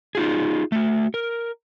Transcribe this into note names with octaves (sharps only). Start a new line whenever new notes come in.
D#4 F4 G#4
A3 F#4
A#4